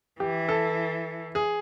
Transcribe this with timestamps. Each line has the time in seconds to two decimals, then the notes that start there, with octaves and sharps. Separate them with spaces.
0.20 E3 G4
0.49 A4
1.35 G#4